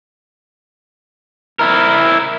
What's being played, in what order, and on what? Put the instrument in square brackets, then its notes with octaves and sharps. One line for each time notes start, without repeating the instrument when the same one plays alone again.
[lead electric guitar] E4 A#4